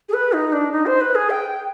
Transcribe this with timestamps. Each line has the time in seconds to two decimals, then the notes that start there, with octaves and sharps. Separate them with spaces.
0.09 G#4
0.14 B4
0.33 D#4
0.53 D4
0.72 D#4
0.86 C5
1.01 B4
1.15 G#4
1.30 G5